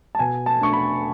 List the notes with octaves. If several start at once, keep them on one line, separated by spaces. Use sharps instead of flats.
A5
B2 G#5
A5
A3 D4 C#6
B5